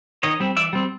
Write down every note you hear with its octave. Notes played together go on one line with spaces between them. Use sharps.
D#3 C#5 D#5
G3 C4
E3 D5 E5
G3 C4